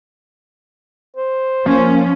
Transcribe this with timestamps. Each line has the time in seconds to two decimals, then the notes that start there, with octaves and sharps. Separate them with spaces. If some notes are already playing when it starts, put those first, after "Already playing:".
1.17 C5
1.66 F3 A#3 C#4